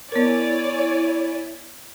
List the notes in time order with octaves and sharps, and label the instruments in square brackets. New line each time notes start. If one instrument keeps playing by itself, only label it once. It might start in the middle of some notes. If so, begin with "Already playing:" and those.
[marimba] B3 A#4 [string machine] E4 [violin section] C#5 D5 G#5